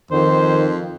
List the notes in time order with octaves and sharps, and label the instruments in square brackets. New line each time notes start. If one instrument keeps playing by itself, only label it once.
[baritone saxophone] F2 [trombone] D#3 [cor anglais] C5